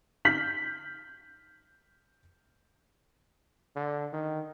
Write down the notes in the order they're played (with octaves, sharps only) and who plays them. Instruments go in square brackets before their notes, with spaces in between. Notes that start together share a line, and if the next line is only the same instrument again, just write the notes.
[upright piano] F6 G6 B6 F#7
[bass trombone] D3
D#3